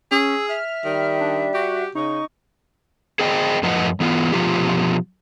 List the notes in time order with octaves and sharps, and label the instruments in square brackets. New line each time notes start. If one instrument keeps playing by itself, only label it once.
[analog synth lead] C#4 [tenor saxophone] G#4 [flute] E6
[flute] E5 [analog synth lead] F6
[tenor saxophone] D#3 [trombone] G3
[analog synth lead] D4
[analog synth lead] F#4 [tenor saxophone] G4
[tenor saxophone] C#3 [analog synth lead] D#4 [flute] C#6
[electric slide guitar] G#4 C5 D#5 G5
F#2 A2 F3 B4 D#5 F#5
E3 B3 F4
B2 F3 F4 G4